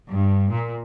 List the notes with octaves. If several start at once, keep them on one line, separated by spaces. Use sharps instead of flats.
G2
A#2